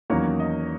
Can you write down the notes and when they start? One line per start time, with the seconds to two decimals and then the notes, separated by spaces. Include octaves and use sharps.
0.10 E2 D#3 F#3 A#3 C#4 C#5
0.40 D#5